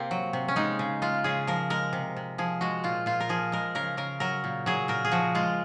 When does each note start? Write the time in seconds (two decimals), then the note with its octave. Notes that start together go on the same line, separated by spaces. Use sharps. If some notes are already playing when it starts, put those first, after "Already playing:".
Already playing: C3 A#3 C4
0.11 F#3
0.33 C3
0.48 C#4
0.56 G#3 D#4
0.79 C#3
1.02 G#3 F4
1.24 C#3 G#4
1.47 F3 A#4
1.70 G#3 A#4
1.93 C3
2.16 C3
2.38 F3 G#4
2.61 G#3 F#4
2.84 A#2 F4
3.06 A#2 F4
3.20 A#4
3.29 F3 G#4
3.52 G#3 A#4
3.75 C#3 A#4
3.97 C#3 A#4
4.20 F#3 A#4
4.44 A#2
4.66 F#3 G#4
4.88 A#2 A#4
5.05 G#4
5.12 F3 F#4
5.35 G#3 F4